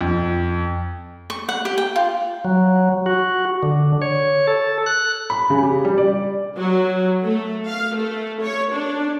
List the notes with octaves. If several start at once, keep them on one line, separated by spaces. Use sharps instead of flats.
F2
C#6
F#5
G4
G5
F4
F#3
F#4
D3
C#5
A4
F#6
B5
C#3
G4
G3
D5
F#3
A3
F5
A3
C#5
D4